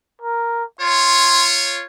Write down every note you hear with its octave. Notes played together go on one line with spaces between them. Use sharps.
A#4
F4 C#5 C6